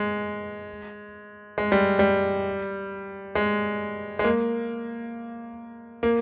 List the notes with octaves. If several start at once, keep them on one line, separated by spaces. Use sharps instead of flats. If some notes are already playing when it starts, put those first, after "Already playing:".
Already playing: G#3
G#3
G3
G3
G#3
G#3
A#3
A#3